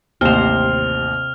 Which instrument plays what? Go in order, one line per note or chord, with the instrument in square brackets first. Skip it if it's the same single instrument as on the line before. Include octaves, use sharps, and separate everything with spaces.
[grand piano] A1 D#2 [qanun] C3 C5 [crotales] F6 F7